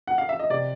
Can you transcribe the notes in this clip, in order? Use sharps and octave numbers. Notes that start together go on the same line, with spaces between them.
F#5
F5
E5
D#5
C3 D5